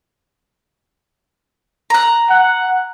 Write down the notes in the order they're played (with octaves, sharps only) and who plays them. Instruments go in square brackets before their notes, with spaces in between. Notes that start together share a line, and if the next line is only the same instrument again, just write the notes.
[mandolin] A#5 F#6
[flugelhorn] F#5